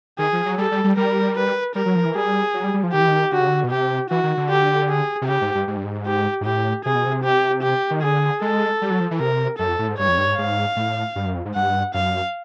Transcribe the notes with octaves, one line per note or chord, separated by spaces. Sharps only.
D#3 G#4
F3
F#3
G3 A4
G3
G3
G3 A#4
B4
G3 A#4
F#3
F3
E3
G3 G#4
F#3
G3
G3
F3
D#3 G4
E3
D#3
D3 F#4
C#3
D3
B2
C3 G4
E3 F#4
D#3
D3
G4
G#4
C3
C#3 G4
G#2
G2
G#2
G2
G#2
G4
G#2
A2 G4
C3 G#4
B2
C3
G4
G4
D#3
D3 G#4
G#3 A4
G3
F#3
F3
E3
C3 A#4
F#2 A4
F2
A2
G#2
G2 C#5
F2
G2
G#2
G#2 F5
A2
G2
F#2
F2
G#2
G2 F#5
F#2 F5